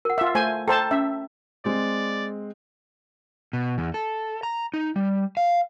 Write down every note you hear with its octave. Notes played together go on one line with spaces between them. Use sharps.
A#4 F#5
F4 E5
A3 C5 G#5
A4 C5 G5 A5 A#5
C#4 E5
G#3 C4 D5
B2
E2
A4
A#5
D#4
G3
F5